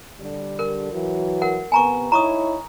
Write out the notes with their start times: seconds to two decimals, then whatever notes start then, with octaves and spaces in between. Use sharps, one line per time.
0.20 D3 G3
0.59 A#4
0.92 E3 F#3
1.42 A#4 F#5
1.72 C3 B3 G#5 A#5 C#6
2.12 D#4 E4 C#5 A#5 C#6 D#6